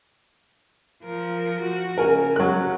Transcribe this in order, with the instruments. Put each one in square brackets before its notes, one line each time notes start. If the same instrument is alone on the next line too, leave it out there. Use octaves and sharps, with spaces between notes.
[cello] F3 A#4
F#4
[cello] C#3 [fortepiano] A#4 G#5
[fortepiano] F#3 F#6